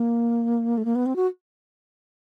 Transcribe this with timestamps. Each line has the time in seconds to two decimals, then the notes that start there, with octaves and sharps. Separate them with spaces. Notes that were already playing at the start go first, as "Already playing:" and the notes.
Already playing: A#3
0.78 A3
0.85 A#3
0.95 B3
1.06 C4
1.16 F#4